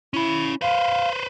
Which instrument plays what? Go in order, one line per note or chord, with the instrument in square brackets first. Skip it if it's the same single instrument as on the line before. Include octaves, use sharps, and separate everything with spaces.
[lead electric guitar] C#4 B5 [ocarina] E4
[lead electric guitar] B4 C5 [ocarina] F5